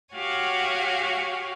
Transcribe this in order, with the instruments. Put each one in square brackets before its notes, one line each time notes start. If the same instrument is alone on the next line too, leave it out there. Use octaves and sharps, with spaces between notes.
[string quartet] F#4 G4 C#5 F5 F#5 G#5